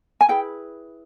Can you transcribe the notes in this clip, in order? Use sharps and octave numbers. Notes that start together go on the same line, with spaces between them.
G#5
E4 G#4 B4 G5